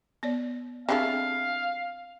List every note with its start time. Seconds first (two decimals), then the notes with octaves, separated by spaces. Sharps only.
0.23 B3 C#5 D5
0.89 G3 C4 D4 E4 G#4 A4 F5